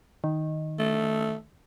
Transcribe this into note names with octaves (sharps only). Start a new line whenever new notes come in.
D#3
A3